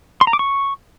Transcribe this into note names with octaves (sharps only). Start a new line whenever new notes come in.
C6
A#5
D6
C#6